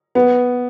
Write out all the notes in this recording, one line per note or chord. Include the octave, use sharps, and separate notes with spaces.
B3